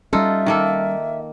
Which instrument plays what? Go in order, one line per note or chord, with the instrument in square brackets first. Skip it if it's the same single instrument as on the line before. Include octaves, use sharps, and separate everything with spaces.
[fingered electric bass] G3 C#4 [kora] D#4 F4 A4 [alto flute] E5
[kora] D#3 A#3 A4